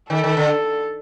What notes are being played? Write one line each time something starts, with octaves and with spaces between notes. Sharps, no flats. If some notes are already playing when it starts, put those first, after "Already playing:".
D#3 A4
D#3
D3